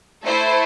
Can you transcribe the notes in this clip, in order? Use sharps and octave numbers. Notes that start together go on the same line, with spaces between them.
A3 E4 A4 C5